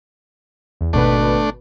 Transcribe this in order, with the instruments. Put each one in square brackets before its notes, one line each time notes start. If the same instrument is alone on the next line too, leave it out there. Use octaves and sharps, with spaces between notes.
[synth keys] E2
[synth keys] G#1 B2 B4 [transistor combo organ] A3 D4